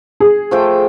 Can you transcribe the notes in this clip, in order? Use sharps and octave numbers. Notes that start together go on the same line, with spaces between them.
G#4
F3 A3 G5